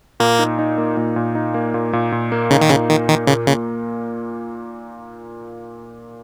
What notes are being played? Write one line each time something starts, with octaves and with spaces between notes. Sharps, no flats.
A#2 A#3
D#4
D#4
A#3
A#2
A#2
D#4
A#3
A#2
A#2
A#2
A#3
C#3 D#4
D#3
A#2 C#3
D#3 A#3
D#3 A#3
A#2 C#3
A#2 C#3